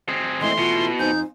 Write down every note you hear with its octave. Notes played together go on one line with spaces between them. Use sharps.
C4 G#4
E3 A3 E4 D#5 C6
B2 F4
F2 D#4 C5 G#5 G6